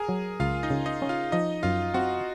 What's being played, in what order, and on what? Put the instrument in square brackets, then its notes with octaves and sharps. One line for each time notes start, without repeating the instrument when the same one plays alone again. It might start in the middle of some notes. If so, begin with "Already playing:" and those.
Already playing: [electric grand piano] G#4 A#4 G#5 A#5
[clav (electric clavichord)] F#3
[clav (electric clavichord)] C#2 [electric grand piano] F4 F5
[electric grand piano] D#4 D#5
[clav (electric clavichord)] C#3
[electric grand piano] D#4 D#5
[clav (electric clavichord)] C#4
[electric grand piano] F4 F5
[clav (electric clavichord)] F3 [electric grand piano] D#4 D#5
[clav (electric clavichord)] F#2 [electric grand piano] F4 F5
[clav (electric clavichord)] C4 [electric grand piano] F#4 F#5